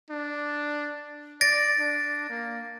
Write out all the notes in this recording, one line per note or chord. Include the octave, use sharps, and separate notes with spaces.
D4
D5 A6 A#6 D7
D4
A#3